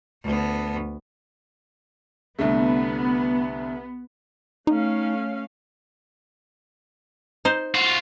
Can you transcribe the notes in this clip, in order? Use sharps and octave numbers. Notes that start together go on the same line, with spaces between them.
D2 B3
C2 D3 A3 B3
A3 C#4 D#4 F5
D#4 C5
F4 F#4